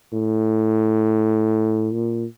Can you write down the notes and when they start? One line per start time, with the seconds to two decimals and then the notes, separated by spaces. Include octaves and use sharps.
0.13 A2
1.93 A#2